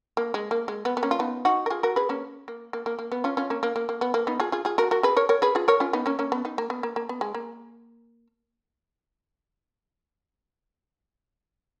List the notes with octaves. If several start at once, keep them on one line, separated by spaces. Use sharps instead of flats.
A#3
G#3
A#3
G#3
B3
B3
A#3 C#4
F4
B3 D#4
D#4 F#4
A#4
F4 G#4
F#4 A#4
G#4 B4
A#3 C#4
A#3
A#3
A#3
A#3
B3
C#4 F4
C#4 F4
A#3 C#4
A#3
A#3
A#3
B3
A#3
B3 D#4
F4 G#4
F4 G#4
F4 G#4
F#4 A#4
F#4 A#4
G#4 B4
A#4 C#5
A#4 C#5
G#4 B4
F4 G#4
A#4 C#5
C#4 F4
B3 D#4
A#3 C#4
A#3 C#4
B3
B3 D#4
A#3
B3
A#3
A#3
B3
G#3
A#3